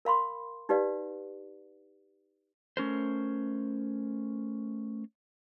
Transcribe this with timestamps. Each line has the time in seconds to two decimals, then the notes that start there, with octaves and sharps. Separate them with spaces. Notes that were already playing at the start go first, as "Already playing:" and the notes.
0.05 A#4 F5 B5 C6
0.69 D#4 G4 B4 D5 F5
2.77 A3 C#4 A#4 C5